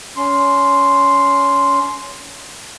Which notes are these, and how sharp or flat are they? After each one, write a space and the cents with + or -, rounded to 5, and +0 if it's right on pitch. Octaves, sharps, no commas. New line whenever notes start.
C#4 +25 C6 +0